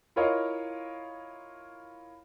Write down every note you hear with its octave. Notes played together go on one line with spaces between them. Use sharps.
E4 F4 A#4 C#5 D#5 F5